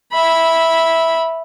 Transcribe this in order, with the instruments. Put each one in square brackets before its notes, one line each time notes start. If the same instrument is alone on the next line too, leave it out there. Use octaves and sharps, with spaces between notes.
[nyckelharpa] E5 B5